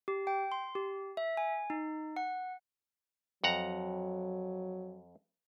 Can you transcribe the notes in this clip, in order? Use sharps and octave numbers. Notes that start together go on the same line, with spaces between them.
G4
G5
C6
G4
E5
G#5
D#4
F#5
F2 F#3 F#5 A#5